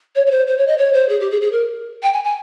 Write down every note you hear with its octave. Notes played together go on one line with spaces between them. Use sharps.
C#5
C#5
C5
C5
C#5
D#5
C#5
C5
G#4
G4
G#4
G#4
A#4
G5
G#5
G#5